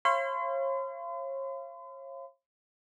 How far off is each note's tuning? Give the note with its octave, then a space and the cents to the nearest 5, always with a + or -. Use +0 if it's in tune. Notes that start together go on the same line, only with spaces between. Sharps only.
C#5 -40 F5 -35 C6 -45